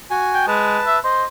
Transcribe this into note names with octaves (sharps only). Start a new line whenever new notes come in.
F#4 G#5
G5
G#3 B4 A5
E5
C5 D#5